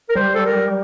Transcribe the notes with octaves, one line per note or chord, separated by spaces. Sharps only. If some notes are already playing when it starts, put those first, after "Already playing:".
A#4
G3 C5
A4
A#4